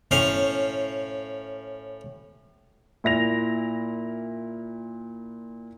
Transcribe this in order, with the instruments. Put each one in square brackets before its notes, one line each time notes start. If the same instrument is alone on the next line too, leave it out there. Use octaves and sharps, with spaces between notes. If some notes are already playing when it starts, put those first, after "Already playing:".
[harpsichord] A2 C#4 C5 F5
[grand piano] A#2 E4 A#6 F7